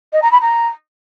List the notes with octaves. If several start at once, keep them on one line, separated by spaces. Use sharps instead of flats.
D#5
A#5
B5
A#5